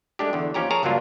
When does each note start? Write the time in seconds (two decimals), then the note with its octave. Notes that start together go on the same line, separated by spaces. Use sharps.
0.19 G#3 A3 D4 G4
0.33 E2 D3
0.54 D#2 F3 C#4 G4 A#5
0.71 G#4 A#4 C#5 A5 A#5
0.83 C#2 G2 F#3 A#3 D4 F4